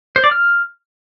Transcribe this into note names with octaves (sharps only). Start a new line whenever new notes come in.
C5
D5
F6